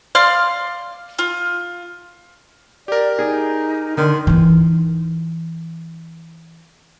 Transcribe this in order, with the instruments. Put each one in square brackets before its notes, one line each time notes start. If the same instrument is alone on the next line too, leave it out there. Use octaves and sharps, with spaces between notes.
[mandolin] D5 F5 C6 F6
F4
[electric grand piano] G4 A#4 [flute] D5
[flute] D#4 [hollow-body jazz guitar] G#4
[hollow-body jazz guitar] D3 [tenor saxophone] D#3 [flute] C6
[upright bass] E3 D#4